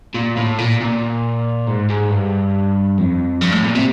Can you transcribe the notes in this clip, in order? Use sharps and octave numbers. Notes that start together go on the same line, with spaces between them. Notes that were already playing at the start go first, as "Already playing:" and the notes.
A#2
A2
A#2
A#2
G#2
G#2
G2
F2
G2
A2
A#2
C3